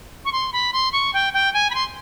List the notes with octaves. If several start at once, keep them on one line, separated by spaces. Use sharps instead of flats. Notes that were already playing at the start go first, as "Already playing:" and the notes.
C#6
C6
B5
C6
C#6
G5
G5
G#5
B5
C6